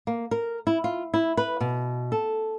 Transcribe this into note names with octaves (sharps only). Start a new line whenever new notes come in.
A#3
A#4
E4
F4
E4
B4
B2
A4